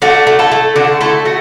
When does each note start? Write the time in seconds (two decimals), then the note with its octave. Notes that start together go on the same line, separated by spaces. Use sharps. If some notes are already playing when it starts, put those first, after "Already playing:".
0.02 A3 D4 F#4
0.27 A3
0.39 E4 A4
0.51 A3
0.76 D3 D4 F#4
1.01 A3 E4 A4
1.25 A3 F#4